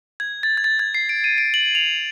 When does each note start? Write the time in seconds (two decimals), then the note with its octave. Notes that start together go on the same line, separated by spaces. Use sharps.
0.20 G#6
0.43 A6
0.57 G#6
0.64 A6
0.79 G#6
0.95 C7
1.09 D7
1.24 D#7
1.38 D7
1.54 F#7
1.75 F7